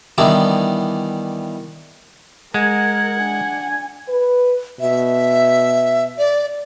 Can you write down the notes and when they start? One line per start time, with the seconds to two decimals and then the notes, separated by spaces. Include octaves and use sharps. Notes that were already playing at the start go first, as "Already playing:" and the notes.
0.18 D#3 E3 G3 B3 D4 E4
2.54 G#3 A#4 F#5 G#6
3.19 D4 G#5
4.08 B4
4.80 B2 E5
6.18 D5